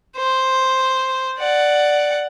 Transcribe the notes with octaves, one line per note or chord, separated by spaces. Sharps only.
C5
D5 F#5